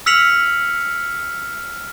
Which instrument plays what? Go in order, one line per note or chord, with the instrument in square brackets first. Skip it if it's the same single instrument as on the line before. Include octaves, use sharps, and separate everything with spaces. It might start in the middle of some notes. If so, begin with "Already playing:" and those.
[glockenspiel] E6 F6 B6 C#7 F7 F#7